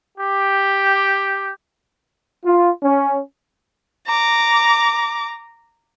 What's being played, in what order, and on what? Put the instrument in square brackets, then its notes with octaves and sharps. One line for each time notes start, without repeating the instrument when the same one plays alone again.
[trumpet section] G4
[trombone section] F4
C#4
[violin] A#5 D6